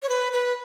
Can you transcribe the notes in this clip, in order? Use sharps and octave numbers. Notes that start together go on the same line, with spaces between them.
C#5
B4
B4